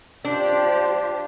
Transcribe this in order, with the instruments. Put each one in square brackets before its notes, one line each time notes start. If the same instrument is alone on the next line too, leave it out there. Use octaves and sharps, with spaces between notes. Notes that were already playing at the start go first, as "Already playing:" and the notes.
[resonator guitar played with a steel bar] D4 [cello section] F4 G4 C5